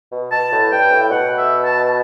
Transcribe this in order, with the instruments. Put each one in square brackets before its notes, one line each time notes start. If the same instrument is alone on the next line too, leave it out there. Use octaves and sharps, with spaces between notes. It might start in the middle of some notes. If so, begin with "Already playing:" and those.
[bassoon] B2
[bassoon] B2 [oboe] A5
[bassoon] A2
[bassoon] G2 [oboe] G5
[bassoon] A2
[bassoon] B2 [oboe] F#5
[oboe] E5
A5